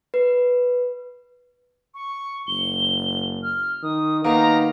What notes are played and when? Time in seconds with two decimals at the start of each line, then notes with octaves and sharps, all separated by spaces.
0.14 B4
1.95 C#6
2.47 F#1 G7
3.43 F6
3.83 D#3 D#6
4.24 D#3 A#3 B3 A#5